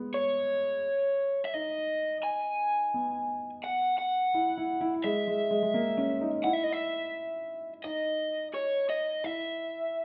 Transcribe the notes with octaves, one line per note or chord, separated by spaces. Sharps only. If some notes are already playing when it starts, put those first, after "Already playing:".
Already playing: G#3 B3
C#5
E5
D#4 D#5
G#5
B3
F#5
F#5
E4
E4
E4
G#3 E5
G#3
G#3
G#3
A#3
C#4
D#4
E4 F#5
E5
D#5
E5
D#4 D#5
C#5
D#5
E4 E5